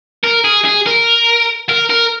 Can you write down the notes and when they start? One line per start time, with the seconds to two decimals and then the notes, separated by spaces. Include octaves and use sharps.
0.24 A#4
0.44 G#4
0.65 G#4
0.86 A#4
1.69 A#4
1.90 A#4